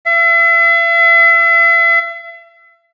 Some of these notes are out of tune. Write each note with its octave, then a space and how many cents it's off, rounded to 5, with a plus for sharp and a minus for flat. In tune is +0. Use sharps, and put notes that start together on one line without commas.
E5 +40